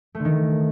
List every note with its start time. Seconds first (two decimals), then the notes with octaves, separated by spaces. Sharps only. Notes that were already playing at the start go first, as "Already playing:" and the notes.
0.15 A3
0.20 D3
0.25 D#3